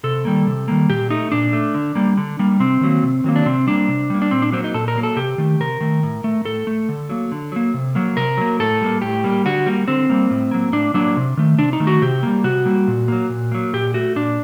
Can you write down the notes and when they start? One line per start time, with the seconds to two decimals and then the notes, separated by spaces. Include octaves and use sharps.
0.03 C3 A4
0.25 D#3 G3 A#3
0.47 C3
0.68 D#3 G3 A#3
0.89 A#2 G4
1.10 A3 D#4
1.32 A#2 D4
1.53 A3
1.74 D3
1.95 G3 A#3
2.17 D3
2.39 G3 A#3
2.59 C3 C4
2.81 D#3 F#3 A#3
3.03 C3
3.24 D#3 F#3 A#3
3.36 D4
3.46 C3 C4
3.67 G3 A#3 D4
3.88 C3
4.10 G3 A#3
4.22 D4
4.31 A#2 C4
4.42 D4
4.52 F#3 A#3 C4
4.64 D#4
4.74 A#2 A4
4.88 A#4
4.95 F#3 A#3
5.03 A4
5.16 C3 G4
5.38 D#3 A3
5.60 C3 A#4
5.81 D#3 A3
6.03 A2
6.24 A3
6.45 A2 A4
6.67 A3
6.89 D3
7.10 F#3 A#3
7.32 D3
7.52 F#3 A#3
7.74 C3
7.95 F#3 A#3
8.17 C3 A#4
8.37 F#3 A#3
8.60 A2 A4
8.81 G3 A#3
9.02 A2 G4
9.24 G3 A#3
9.45 D3 F#4
9.66 G3 A#3
9.88 D3 C4
10.10 G3 A#3
10.30 A2
10.51 F#3 A#3
10.73 A2 D4
10.94 F#3 A#3 D4
11.17 C3
11.37 D#3 A3
11.58 C3 D4
11.73 D#4
11.80 D#3 A3
11.87 F#4
12.02 C3 G4
12.23 G3 A#3
12.44 C3 F#4
12.65 G3 A#3
12.88 A#2
13.08 F#3 A#3
13.30 A#2
13.52 F#3 A#3
13.73 A#2 G4
13.94 A3 F#4
14.16 A#2 D4